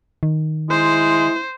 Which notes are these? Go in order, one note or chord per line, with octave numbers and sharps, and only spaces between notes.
D#3
G#3 E4 C5